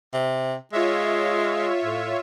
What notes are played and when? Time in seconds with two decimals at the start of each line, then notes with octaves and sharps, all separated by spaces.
0.13 C3
0.73 G#3 F4 C#5 E5
1.84 A2